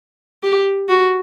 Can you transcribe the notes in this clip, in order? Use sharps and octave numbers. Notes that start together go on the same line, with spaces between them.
G4
F#4